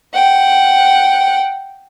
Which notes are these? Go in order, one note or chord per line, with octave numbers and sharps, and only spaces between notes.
F#5 G5